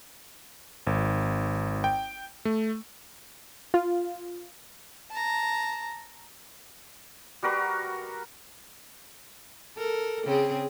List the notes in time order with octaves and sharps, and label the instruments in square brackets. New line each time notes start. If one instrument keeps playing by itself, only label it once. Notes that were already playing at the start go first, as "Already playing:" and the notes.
[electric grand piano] G#1
G5
A3
[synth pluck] F4
[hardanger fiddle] A5 A#5
[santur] G3 F#4 A#4 B4
[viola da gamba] A4 A#4
C#3 C4 G#4